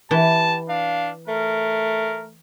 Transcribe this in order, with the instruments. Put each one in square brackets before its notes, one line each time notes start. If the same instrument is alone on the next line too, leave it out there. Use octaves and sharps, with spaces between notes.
[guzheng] E3 [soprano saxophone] G4 [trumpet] A5
[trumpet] D4 [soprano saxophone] F5
[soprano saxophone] A3 [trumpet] A#4